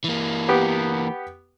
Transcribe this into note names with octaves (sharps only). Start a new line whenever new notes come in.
E3 A#3
B3 G4